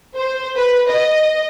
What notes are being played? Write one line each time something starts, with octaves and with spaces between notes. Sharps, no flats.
C5
B4
D#5